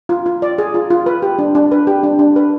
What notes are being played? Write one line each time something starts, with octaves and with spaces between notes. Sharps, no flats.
F4
F4
D5
G#4
F4
F4
B4
G4
D4
D4
B4
G4
D4
D4
B4